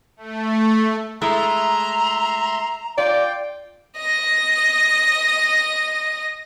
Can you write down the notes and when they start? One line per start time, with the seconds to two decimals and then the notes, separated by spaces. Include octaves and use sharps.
0.17 A3
1.22 G#3 A3 E4 E5 A#5 C6
2.98 F4 D5 G5
3.98 D#5 A#6